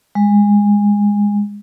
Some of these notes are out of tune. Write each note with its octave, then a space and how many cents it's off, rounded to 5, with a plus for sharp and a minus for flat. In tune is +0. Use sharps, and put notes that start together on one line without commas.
G#3 -20